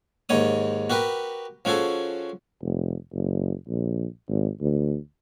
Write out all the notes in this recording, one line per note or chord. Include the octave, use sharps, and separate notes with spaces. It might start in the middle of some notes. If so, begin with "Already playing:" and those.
D#2 G#2 D#4 C#5 D#6
F#4 G4 A#4 B4
F3 C#4 F#4 G#4 A4
F1
F#1
A#1
G#1
D2